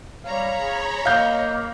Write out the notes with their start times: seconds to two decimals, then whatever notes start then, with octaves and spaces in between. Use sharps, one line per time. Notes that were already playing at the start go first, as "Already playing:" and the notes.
0.25 G3 C#5 F5 A#5 B5
0.59 G#4
1.05 A#3 D#5 F5 G6